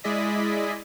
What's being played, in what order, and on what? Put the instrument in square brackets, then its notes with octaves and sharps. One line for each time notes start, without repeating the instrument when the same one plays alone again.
[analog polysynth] G#3 E4 G#4 D5 D#5 B6